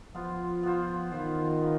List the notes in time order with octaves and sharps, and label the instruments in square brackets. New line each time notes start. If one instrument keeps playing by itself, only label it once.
[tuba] F3 [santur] B3 F4 C5
[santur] B3 F4 C5
[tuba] D#3 [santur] B3 F4 C5
[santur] B3 F4